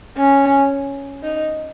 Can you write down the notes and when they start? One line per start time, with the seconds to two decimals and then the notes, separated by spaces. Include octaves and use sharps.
0.17 C#4
1.24 D#4